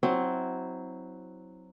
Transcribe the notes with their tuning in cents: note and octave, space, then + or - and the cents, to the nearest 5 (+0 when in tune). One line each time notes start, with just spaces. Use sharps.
F#3 +0 C4 +0 E4 -30